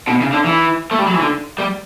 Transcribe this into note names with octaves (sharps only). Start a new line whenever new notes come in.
B2
C#3
D3
E3
A3
G3
F#3
E3
D3
G3